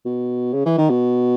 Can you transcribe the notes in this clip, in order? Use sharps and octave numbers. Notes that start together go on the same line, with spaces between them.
B2
C#3
E3
D#3
B2